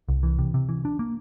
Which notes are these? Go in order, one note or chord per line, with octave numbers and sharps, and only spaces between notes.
C2
E3
C3
C3
E3
D4
A#3